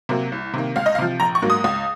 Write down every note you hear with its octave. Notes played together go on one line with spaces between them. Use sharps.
C3 F#3 A#3
C2
C3 D#3 A#3
C#2 F5
D#5
F5
C3 F3
A#1 A#5
C#6
G#2 F#3 A#3
D#6
C#2 D#6